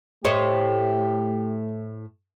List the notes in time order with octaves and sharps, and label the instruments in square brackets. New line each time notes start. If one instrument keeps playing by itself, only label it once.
[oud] A2 C5 D#5 [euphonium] A3 [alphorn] G4 [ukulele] C#5